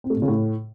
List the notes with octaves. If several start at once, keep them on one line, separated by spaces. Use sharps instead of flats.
C4
A3
A#2
C#3
A2